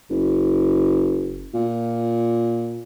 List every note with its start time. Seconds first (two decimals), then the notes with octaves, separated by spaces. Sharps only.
0.10 F#1
1.54 A#2